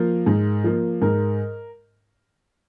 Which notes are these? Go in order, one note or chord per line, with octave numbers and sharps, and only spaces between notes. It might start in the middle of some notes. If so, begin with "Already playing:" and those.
Already playing: F3 A#3 A#4
G#2
F3 A#3
G#2 A#4